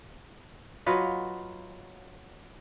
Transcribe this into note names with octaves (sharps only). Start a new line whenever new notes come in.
F#3 F4 B4 D#5